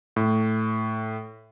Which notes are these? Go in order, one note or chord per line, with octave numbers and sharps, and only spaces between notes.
A2